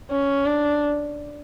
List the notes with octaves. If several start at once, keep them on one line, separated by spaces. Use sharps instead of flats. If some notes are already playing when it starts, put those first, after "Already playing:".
C#4
D4